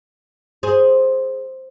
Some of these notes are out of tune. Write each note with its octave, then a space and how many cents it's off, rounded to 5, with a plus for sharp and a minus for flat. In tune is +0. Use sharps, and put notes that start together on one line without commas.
G#4 +0 C5 +0